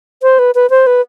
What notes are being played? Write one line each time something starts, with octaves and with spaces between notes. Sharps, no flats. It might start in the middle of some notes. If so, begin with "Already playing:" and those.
C5
B4
B4
C5
B4